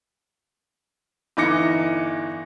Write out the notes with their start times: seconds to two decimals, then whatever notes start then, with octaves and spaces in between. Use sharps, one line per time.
1.37 G1 E3 D#4 D6 A#6 C#7